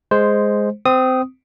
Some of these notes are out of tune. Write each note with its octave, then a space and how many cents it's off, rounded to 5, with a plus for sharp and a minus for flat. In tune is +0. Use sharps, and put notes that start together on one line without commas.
G#3 +0 C5 +0
C4 -20 D#6 +0